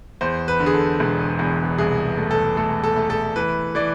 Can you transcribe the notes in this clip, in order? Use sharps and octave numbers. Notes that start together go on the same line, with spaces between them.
E2 C5
B4
D3
G#4
A4
E1
E2
C2 G#4
A3
A4
A3 A4
A4
A3
A4
E3 B4
E3 D5